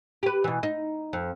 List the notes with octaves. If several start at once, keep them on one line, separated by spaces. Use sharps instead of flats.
G4 B4
B2 E3
D#4
F2